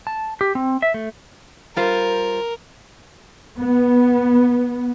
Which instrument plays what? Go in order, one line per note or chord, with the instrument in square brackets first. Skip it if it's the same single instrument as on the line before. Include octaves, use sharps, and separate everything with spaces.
[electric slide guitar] A5
G4
C4
E5
A3
[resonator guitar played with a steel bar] G3 F4 C5 [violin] A#4
[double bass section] B3